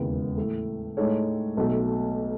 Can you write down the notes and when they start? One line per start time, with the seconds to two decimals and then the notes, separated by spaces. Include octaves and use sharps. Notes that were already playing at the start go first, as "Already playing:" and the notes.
Already playing: E1 D#2 C#3 E3 B3
0.37 A2 E3 A3
0.97 A2 G#3 D#4 A4 C#5
1.57 B1 B2 F#3 A3